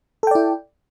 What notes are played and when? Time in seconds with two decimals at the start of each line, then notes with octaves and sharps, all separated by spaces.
0.23 A4
0.27 G5
0.31 D5
0.35 E4